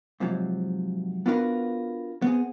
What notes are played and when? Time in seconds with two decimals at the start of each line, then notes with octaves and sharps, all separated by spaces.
0.20 G#2 C3 F3 F#3
1.26 B3 D4 F4 F#4 A#4 B4
2.22 B3 C4 G#4